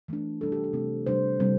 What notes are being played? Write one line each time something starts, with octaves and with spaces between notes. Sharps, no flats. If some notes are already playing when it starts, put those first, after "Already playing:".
E3 A3 D4
C3 G3 D4 A4
G4
A4
C3 A3 C4
C3 G3 D4 C5
C3 G3 C4